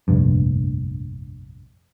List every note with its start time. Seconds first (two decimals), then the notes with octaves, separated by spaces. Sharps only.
0.08 F1 A#1 G2